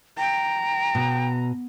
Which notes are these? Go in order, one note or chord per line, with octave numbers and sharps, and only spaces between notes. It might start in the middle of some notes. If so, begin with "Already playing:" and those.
G5 A#5
B2